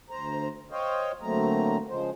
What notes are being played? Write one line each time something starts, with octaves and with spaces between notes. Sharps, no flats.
D2 C5 A#5
C5 C#5 D#5 F5 G5
D2 F#3 A3 A#3 C4 A#5
C#3 F3 G#3 C5